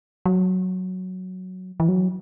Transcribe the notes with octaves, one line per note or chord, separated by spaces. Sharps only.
F#3
E3
F#3